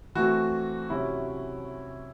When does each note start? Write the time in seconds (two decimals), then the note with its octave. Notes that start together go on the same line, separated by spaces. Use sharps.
0.15 E3 A3 C4 F#4
0.90 C3 F#3 C#4 E4